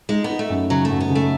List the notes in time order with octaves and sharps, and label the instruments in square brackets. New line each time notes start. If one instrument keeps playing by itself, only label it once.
[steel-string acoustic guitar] G#3 [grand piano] D#4
[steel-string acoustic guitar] B3
[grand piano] D#4
[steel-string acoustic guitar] A3
[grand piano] F#2
[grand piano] C#3 [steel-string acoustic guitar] F#3
[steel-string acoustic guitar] A3
[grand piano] F#2
[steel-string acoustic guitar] B3
[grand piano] C#3
[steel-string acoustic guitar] A3